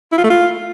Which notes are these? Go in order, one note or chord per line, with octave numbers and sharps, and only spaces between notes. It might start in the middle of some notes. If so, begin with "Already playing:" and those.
E4
F4
A3
F4